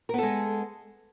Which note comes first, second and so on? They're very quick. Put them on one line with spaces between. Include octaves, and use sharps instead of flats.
A#4 B3 A4 G#3